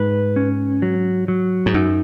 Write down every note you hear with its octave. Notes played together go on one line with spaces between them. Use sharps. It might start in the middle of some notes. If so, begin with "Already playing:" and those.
Already playing: G#2 B4
C#4
F#3
F#3
G#2
F#2 D#4